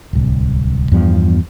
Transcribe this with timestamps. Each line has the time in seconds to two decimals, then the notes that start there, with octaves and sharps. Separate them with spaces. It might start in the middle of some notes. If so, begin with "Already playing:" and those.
0.13 D1 C2
0.92 E2 G2 F3 B3